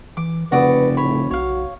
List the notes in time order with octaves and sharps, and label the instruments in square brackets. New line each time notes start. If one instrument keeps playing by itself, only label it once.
[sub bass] E3 [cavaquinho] D6
[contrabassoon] F1 [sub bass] C#3 [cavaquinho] F#4 D5 D#6 [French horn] B4
[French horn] A2 [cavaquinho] C#5 B5
[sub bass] B1 [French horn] F#4 [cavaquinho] C#5 F5